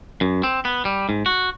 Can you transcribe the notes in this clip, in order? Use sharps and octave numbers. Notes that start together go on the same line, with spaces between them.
F#2
C4
B3
G3
G#2
F#4